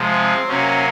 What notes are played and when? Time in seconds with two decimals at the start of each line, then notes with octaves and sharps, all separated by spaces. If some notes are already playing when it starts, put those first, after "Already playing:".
Already playing: C3 F3 G#3
0.13 C4
0.47 C3 F#3 A#3 C#4